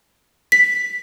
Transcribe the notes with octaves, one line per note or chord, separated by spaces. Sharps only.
B6